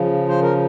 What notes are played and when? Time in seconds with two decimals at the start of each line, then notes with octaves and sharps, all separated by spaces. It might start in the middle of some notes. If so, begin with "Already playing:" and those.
Already playing: C#3 F3
0.29 C5
0.42 A#4